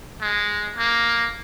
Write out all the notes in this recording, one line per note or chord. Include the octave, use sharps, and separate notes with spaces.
G#3
A#3